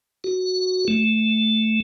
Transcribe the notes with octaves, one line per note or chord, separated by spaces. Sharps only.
F#4
A3